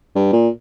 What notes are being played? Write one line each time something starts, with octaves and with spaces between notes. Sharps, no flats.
G2
A#2